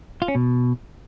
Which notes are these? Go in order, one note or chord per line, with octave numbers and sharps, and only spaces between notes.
F4
C#4
B2